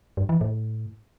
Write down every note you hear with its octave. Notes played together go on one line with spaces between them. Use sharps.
G2
E3
A2